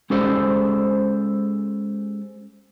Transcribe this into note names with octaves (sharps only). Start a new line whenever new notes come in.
G#3 C#4 G4 A4 C5